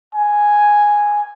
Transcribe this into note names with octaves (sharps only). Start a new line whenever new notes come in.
G#5